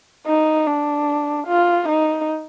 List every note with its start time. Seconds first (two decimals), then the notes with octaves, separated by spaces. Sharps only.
0.27 D#4
0.67 D4
1.47 F4
1.89 D#4